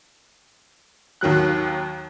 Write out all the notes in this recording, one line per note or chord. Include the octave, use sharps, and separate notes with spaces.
D#2 D#3 F#3 F#6